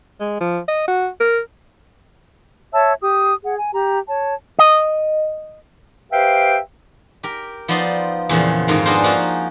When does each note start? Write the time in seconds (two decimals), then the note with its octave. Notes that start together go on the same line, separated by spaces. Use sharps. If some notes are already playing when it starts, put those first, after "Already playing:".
0.20 G#3
0.40 F3
0.68 D#5
0.87 F#4
1.20 A#4
2.73 C#5 E5 A5 E6
3.02 G4 D#6
3.44 G#4 F#5
3.57 G#5
3.74 G4 A#5
4.09 C#5 A5
4.59 D#5
6.12 G4 B4 C5 E5 F5 G5
7.23 G4 A#4
7.68 F3 B3 D#4 D5 C6
8.29 E2 A#2 C#3 F3
8.68 F2 G#2 D#3 A#4 F5
8.86 B3 D4 D#4 G#4 A#4 C5
9.04 F3 A#3 D#4 F#4